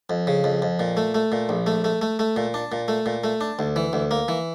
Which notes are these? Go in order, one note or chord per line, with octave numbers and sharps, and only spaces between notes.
F2
C#3
F2
F2
A#2
A3
A3
A#2
A#1
A3
A3
A3
A3
A#2
D4
A#2
A3
A#2
A3
D4
D2
E3
D2
A#3
E3